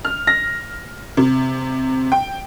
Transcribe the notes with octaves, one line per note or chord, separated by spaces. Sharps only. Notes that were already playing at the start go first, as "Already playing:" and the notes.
F6
A#6
C3
G5